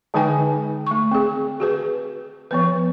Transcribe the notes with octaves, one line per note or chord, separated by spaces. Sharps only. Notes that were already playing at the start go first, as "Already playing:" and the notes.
D3 G#3 D#4 B4 G5 G#5
A3 C#6
C4 G#4
F#4 G#4 B4
F3 B3 B4